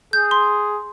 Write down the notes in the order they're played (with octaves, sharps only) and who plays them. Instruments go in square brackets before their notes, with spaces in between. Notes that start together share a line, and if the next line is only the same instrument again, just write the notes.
[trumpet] G#4 [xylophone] G6
[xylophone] C6